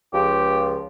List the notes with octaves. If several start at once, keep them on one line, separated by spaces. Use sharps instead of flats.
C#2 F3 G4